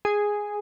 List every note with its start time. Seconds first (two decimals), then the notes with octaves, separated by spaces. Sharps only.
0.05 G#4